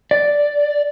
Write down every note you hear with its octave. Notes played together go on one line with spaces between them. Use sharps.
D5